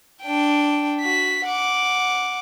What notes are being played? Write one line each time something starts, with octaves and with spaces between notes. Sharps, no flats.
D4 G5
F#4 B6
F#5 D6